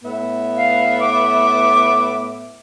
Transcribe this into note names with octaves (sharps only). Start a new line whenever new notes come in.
A2 B3 E5
F5
D6